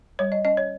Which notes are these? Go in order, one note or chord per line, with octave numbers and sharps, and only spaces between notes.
G3 C#5
D#5
C#4 D#5
C#5